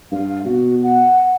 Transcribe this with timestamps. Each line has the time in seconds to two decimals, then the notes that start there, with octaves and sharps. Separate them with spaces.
0.12 G2 F5
0.45 B2 F#4
0.83 F#5